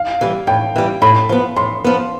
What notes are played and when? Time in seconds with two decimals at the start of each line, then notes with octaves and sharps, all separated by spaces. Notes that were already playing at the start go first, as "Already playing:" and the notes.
Already playing: F5
0.21 E3 G3
0.47 A2 G5
0.76 E3 G3
1.02 A2 B5
1.29 F3 B3
1.56 A2 C6
1.84 F3 B3